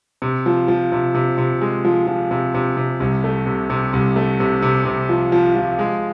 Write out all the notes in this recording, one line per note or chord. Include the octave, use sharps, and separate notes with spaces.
C3
F3
F3
C3
C3
C3
G#3
F3
F3
C3
C3
C3
C2
A3
C3
C3
C2
A3
C3
C3
C3
F3
F3
F3
G#3